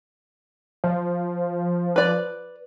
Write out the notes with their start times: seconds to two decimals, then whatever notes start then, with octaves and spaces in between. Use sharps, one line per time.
0.84 F3
1.96 B4 D5